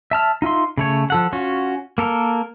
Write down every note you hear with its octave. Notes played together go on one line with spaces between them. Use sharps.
E5 A5 F6
D#4 F4 E5 C6
C#3 A3 C#5
F3 A4 F#5
C#4 F4 F#4
A#3 A4 A#4